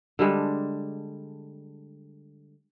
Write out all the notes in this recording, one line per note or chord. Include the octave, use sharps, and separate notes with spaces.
D3 G3 G#3 D4